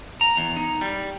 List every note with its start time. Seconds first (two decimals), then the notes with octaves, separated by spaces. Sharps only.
0.21 A#5
0.37 E2
0.56 D#4
0.81 G3